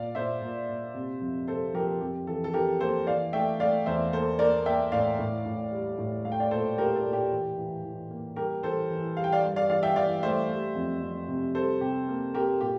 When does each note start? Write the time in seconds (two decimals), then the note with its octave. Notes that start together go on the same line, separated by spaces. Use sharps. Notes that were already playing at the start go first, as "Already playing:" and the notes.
Already playing: A#2 D5 F5
0.15 A#2 C5 E5
0.42 A#2
0.69 A#2
0.94 C3
1.21 F2
1.48 C3 A4 C5
1.74 F3 G4 A#4
2.01 F2 G4
2.27 E3 A4
2.44 A4
2.54 E3 G4 A#4
2.80 A#3 A4 C5
3.07 E3 D5 F5
3.33 A3 E5 G5
3.60 A3 D5 F5
3.86 E2 C5 E5
4.13 A#3 A4 C5
4.39 A#3 A#4 D5
4.66 A#3 E5 G5
4.92 A2 D5 F5
5.19 A2
5.46 A2
5.72 G3
5.98 A2
6.25 A3 F5
6.32 G5
6.40 D5 F5
6.51 A#2 A4 C5
6.78 A3 G4 A#4
6.96 A4
7.04 A#2
7.13 G4
7.32 E3
7.57 E3
7.84 E3
8.11 A#3
8.36 G3 G4 A#4
8.63 E3 A4 C5
8.90 E3
9.16 G3 F5
9.24 G5
9.32 D5 F5
9.43 G2
9.56 D5 F5
9.69 E3 D5 F5
9.83 E5 G5
9.96 E3 D5 F5
10.22 A3 C5 E5
10.49 G3
10.75 F2
11.02 F2
11.28 C3
11.55 G3 A4 C5
11.81 C3 G4
12.08 A#3
12.34 A#3 G4 A#4
12.61 A#2 G4